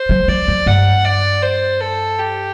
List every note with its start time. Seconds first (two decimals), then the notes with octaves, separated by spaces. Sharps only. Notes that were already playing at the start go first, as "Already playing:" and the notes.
Already playing: C5
0.09 F#3
0.28 F#3 D5
0.48 F#3
0.66 G2 F#5
1.05 D5
1.42 C5
1.81 A4
2.20 G4